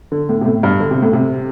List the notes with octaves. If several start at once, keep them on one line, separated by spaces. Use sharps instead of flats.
D3
A2
C3
A2
G2
D3
C3
A2
C3